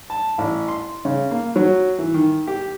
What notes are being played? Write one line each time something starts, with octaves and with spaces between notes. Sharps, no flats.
A5
A1
C6
C#3
A#3
F#3
E3
D#3
G4